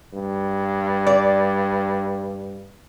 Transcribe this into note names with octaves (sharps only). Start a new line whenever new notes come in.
G2
D5